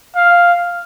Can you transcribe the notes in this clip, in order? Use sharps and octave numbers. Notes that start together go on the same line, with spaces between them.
F5